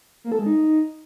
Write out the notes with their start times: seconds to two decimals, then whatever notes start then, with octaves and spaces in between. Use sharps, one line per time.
0.24 A#3
0.32 A4
0.39 G#3
0.46 D#4